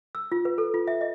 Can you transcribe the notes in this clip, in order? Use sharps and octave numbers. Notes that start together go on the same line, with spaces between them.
E6
F4
B4
A4
F4
E5
D#5